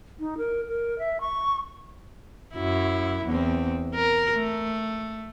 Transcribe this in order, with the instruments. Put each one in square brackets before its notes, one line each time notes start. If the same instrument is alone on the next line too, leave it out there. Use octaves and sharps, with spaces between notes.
[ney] D#4
A#4
A#4
E5
C#6
[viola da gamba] F#2 F#3 E4
E2 C4
A#4
A3